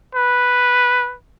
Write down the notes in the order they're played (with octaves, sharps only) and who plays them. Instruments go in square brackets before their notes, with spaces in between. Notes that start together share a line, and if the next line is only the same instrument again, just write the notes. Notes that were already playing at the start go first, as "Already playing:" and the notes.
[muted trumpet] B4